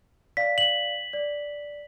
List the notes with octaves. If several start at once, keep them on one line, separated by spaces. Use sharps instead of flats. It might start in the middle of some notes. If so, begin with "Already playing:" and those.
D5 F5 B6
F#7
D5